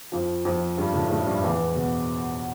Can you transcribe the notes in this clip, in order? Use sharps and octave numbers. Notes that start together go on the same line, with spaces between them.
F2 F3
F2 F3
G2 G3
A2 A3
A2 A3
G2 G3
E2 E3
B2